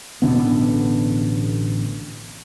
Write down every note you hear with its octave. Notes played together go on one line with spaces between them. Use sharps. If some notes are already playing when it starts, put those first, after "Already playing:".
A1 B2 D3 B3